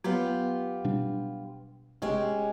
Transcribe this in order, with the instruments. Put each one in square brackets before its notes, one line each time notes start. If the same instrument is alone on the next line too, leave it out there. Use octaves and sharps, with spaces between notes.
[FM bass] F#3 [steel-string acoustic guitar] B3 F4 G4
[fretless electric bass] B2 G3 D4
[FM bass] F1 [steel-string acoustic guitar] G#3 C#4 G4